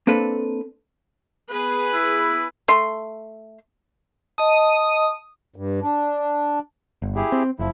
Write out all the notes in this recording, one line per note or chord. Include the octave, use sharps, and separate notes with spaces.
A#3 C4 D4 A4 B4
B3 G#4 B4
E4
A3 C6
D#5 A5 D#6
G2
D4
G1
E4 G4 G#4
C4
F#1 F3 E4